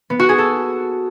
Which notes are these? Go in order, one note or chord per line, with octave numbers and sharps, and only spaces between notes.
B3
F#4
G#4
A4